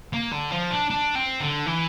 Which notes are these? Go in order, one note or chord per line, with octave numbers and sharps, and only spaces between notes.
A#3
D3
F3
D4
D4
C4
D3
E3